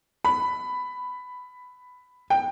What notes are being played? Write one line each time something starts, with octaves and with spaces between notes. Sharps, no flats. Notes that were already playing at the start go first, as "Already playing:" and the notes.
B5
G5